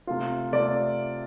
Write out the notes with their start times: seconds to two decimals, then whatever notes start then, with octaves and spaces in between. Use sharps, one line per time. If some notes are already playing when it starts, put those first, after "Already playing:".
0.07 C3 A3 F4
0.52 C3 A3 F4 D5